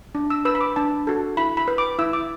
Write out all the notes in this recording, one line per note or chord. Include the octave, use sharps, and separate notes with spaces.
D4
E6
B4 E6
B5
D6
D4 A5
F#4 A4
E4 B5
B5
B4
D6
E4 E6
D6